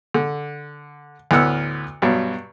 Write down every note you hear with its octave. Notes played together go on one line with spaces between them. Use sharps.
D3
D2 A2 B3 F#5 E6 F6
G2 B2 F#3